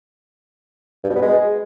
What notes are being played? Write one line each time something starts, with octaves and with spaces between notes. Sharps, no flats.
G2
B2
B3
G#3